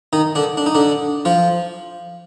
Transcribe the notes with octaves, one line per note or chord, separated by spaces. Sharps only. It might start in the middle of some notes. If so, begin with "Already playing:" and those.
D#3 D#4
D3 D4
D4
D#4
D3 D4
F3 F4